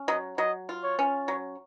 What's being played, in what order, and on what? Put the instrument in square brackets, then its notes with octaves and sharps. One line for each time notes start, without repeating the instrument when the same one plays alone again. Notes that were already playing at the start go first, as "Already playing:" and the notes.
Already playing: [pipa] C#4
[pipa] F#3 [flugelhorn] D#5
[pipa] F#3 [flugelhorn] D#5
[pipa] F4
[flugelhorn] C#5
[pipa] C#4
[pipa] F#3 [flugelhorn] C#5